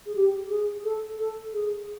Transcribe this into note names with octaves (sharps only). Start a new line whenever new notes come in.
G#4
G4
G#4
A4
A4
G#4